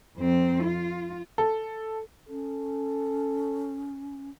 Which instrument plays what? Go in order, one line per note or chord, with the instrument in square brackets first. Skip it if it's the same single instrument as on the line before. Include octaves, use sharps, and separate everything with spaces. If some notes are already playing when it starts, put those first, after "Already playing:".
[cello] F2 C4
F4
[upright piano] A4
[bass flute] C#4 [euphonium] A4